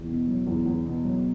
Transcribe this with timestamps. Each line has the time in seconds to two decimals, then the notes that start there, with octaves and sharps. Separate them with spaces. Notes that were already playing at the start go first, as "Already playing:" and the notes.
Already playing: E2
0.08 B2
0.27 F#3
0.47 E2
0.66 E2
0.85 B2
1.04 F#3